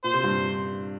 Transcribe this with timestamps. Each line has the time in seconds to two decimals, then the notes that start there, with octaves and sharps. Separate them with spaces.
0.04 A#2 C5
0.14 C3
0.23 G2 A#2